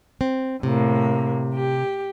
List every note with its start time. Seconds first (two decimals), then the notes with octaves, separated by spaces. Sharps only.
0.21 C4
0.63 A2 C3 A#3
1.55 G4